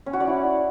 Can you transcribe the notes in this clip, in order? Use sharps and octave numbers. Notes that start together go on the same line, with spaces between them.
C#4
F#4
D5
E4